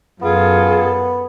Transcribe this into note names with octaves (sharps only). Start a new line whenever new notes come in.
F#2 B3 F4 G#4 A4